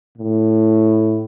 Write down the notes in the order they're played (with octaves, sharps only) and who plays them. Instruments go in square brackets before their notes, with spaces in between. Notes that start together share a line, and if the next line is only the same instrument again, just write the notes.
[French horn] A2